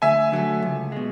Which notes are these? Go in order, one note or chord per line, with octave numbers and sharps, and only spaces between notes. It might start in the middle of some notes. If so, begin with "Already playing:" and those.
D2 E5 G#5
D3 F#3 A3
C#2
B2 G#3